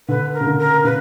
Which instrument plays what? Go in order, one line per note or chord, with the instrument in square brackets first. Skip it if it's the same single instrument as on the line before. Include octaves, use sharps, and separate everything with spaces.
[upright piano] D3 [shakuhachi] B4
[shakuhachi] A#4
[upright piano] C#3
D3
[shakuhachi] A#4
[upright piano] C#3 [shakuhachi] B4